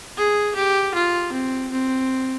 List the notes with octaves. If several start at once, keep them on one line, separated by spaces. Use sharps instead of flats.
G#4
G4
F4
C4
C4